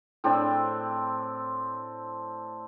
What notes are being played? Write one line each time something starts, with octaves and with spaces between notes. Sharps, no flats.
A2 C4 D4